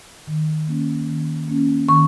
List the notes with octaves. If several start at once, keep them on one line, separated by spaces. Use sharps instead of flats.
D#3
A#3 C#4
D#3
A#3 C#4
D#3 C#6